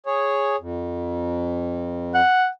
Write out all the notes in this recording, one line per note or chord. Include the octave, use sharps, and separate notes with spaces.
G#4 C#5
F2
F#5